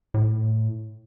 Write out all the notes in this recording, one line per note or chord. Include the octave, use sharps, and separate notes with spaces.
A2